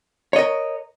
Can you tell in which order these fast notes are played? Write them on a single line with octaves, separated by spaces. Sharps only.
C#5 D#5 A#4